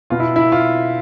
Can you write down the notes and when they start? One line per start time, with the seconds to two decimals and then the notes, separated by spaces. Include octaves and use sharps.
0.10 B2 F4
0.20 E4
0.36 E4
0.52 F4